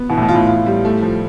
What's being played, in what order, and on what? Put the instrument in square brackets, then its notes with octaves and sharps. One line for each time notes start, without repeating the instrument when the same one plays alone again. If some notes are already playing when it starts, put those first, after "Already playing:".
Already playing: [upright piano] B3
[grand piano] B2 [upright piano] E3
[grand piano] A2
B2
[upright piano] F4
[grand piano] A2
[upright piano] F4
G3
A3
F3